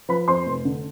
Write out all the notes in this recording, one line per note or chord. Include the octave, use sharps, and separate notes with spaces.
F3 B4 B5
F2 C5 C6
F1
D3